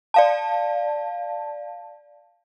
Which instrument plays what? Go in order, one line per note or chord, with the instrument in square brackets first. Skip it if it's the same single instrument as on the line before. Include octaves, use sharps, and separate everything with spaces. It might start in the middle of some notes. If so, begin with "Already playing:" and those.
[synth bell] D5 F5 A5